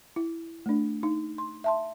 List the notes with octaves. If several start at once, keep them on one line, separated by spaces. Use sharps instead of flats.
E4
A3 D4
D#4
C6
E5 A5 C6